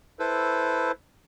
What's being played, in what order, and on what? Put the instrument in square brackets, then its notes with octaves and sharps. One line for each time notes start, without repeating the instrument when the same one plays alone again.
[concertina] E4 A4 B4 C5